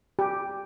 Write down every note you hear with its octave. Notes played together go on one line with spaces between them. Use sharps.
G4